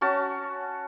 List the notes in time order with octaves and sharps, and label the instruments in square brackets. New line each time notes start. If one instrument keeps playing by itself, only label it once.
[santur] C#4 F#4 A5